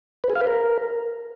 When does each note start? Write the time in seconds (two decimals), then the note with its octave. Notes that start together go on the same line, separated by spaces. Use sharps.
0.24 B4
0.30 G#4
0.35 F5
0.41 B4
0.47 A#4